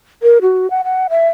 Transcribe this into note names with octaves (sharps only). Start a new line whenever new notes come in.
A#4
F#4
F#5
F#5
E5